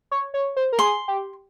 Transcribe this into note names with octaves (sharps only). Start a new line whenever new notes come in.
C#5
C#5
C5
A#4
G#4 C6
G4